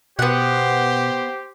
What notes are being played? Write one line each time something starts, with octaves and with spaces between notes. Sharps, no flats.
B2 B3 G4 C5 F#5